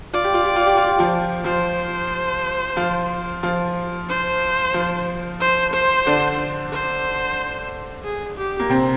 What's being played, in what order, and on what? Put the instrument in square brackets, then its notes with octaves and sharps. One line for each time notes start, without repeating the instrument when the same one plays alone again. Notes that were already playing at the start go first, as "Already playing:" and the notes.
[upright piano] F4 [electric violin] D5
[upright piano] G4
F4
G4
F4
G4
F4
G4
F3 F4
[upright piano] F3 F4 [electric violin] C5
[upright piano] F3 F4
F3 F4
[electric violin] C5
[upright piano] F3 F4
[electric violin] C5
C5
[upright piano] D3 D4
[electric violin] C5
G#4
G4
[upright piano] A#3
C3 C4